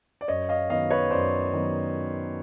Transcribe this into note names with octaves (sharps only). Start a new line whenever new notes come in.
D5
F#2 C#5 D#5
D#5 F5
D#3 F#3 B3 D#5 F5
B4 C#5
F#2 C5 D5
D#3 F#3 B3